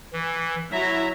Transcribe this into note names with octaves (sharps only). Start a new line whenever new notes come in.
E3
F#3 E4 E5 A#5